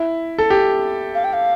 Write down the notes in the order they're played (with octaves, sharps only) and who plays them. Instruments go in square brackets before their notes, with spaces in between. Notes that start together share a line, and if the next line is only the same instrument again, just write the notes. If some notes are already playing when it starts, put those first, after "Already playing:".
Already playing: [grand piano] E4
A4
G4
[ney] F5
G5
F5